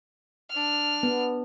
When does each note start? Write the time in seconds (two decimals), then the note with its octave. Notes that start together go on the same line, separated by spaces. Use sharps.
0.50 D4 F6
1.03 B3